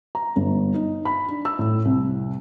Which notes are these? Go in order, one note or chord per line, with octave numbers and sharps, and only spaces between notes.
A#5
G1
D#4
B5
D4
E6
A2
C2